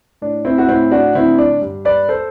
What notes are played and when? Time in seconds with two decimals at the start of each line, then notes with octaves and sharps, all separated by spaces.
0.22 A2 D4
0.45 C4 E4
0.58 F#4
0.68 A2 C4 E4
0.91 D4 F#4
1.15 D3 C4 E4
1.38 D4
1.62 G2
1.85 B4 D5
2.09 A4 C5